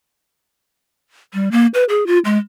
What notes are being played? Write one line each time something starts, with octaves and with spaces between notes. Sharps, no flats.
G3
A#3
B4
G#4
F4
G#3